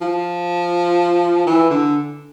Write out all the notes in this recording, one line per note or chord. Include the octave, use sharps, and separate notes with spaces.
F3
E3
D3